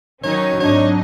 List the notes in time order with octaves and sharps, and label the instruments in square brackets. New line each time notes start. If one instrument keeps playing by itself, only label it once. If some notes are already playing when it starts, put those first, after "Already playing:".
[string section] D#3 C#4 D#4 [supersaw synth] F#3 [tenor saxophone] C#5
[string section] G#1 D#4 D#5 [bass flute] D4 [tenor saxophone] C#5